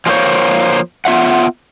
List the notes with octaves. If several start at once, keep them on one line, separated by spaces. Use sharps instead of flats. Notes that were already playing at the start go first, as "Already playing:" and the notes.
F3 G#3 A#3 C4 C5 C#5
B3 F4 E5 F#5